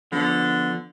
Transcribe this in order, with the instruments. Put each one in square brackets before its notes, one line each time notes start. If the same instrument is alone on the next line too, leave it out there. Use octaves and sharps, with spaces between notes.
[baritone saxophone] D3 [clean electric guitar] F3 B3